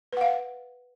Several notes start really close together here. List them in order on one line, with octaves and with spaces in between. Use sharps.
B4 F#5 F5